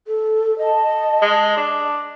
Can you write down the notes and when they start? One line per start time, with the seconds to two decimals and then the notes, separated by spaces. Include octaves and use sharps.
0.07 A4
0.59 D#5 A5
1.22 G#3
1.57 D4